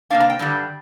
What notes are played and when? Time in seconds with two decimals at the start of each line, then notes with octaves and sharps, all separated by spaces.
0.10 C3 A#3 D4 F5
0.20 A#5
0.30 G5
0.39 G2 D3 G3